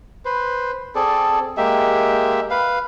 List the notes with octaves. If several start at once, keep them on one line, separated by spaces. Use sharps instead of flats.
B4 C5
C4 G#4 A4 D5
G#3 A#3 G4 E5
B4 F5